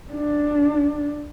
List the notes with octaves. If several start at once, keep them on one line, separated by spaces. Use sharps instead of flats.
D4